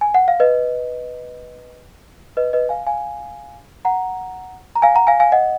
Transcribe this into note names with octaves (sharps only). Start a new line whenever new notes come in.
G#5
F#5
F5
B4 D#5
B4 D#5
B4 D#5
F5 G#5
F5 G#5
F#5 A#5
A#5
F5 G#5
F#5 A#5
F5 G#5
F5 G#5
D#5 F#5